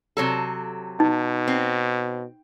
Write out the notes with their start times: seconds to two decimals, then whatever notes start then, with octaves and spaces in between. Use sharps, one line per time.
0.17 C3 F#3 A4
1.00 B2 D#4
1.48 C4